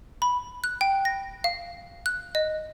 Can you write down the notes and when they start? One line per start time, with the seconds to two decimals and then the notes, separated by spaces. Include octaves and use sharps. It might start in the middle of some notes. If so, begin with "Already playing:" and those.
0.22 B5
0.64 F#6
0.81 G5
1.05 A#6
1.44 F5
2.06 F#6
2.35 D#5